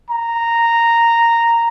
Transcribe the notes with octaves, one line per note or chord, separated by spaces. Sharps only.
A#5